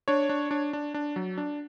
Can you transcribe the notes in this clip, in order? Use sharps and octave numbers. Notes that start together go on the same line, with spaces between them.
D4 C#5
D4
D4
D4
D4
F#3
D4